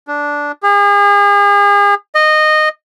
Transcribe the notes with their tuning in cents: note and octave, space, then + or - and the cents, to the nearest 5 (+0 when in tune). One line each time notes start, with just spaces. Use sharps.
D4 -10
G#4 -40
D#5 -15